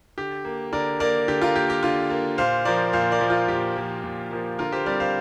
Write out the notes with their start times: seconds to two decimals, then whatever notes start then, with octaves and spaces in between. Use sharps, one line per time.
0.18 D3 G4
0.45 A#3
0.73 D3 A#4 D5
1.00 A#3 A#4 D5
1.28 D3 G4
1.42 F4 A#4
1.55 A#3 G4
1.70 G4
1.83 D3 F4
2.10 A#3
2.38 A#2 C5 F5
2.65 F3 A#3 A#4 D5
2.93 A#2 C5 F5
3.11 A#4 D5
3.21 F3 A#3
3.30 F4 A#4
3.48 A#2 G4
3.76 F3 A#3
4.04 A#2
4.31 F3 A#3
4.59 D3 F4 A#4
4.72 G4 C5
4.86 G3 C4 A#4 D5
5.00 C5 F5